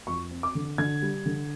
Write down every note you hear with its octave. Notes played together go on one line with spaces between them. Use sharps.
F2 C#6
C4
D6
D3
D3 G#6
G3
D3